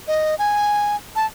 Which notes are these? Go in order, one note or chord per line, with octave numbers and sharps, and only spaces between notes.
D#5
G#5
A5